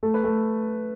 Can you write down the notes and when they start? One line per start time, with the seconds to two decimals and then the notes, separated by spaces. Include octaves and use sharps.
0.03 A3 A4
0.14 B4
0.24 A3 A4